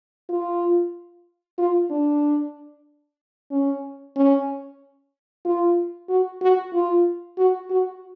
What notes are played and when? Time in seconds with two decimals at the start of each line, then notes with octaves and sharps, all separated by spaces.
0.29 F4
1.58 F4
1.91 D4
3.51 C#4
4.16 C#4
5.45 F4
6.09 F#4
6.41 F#4
6.73 F4
7.38 F#4
7.70 F#4